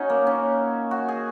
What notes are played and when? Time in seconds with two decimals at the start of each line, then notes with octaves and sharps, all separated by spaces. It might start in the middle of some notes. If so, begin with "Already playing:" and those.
Already playing: C#4 D#4 F#4
0.10 A#3
0.27 C#4
0.91 F#4
1.08 G#4